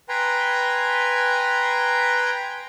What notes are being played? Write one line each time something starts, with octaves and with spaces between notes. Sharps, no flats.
B4 G5 G#5 A#5 C6